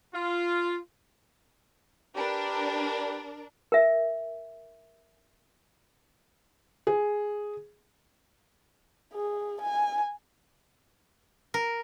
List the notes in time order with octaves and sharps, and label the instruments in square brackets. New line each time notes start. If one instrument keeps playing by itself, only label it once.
[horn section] F4
[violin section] D4 A#4 [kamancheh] G4 B4
[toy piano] A#4 E5
[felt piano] G#4
[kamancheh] G#4
G#5
[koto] A#4